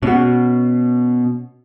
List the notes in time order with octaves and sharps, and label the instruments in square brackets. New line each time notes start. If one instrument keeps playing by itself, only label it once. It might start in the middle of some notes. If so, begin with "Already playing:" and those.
[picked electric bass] B2 [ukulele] C#4 F#4